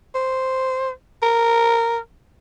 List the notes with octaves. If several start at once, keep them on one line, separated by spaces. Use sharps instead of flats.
C5
A#4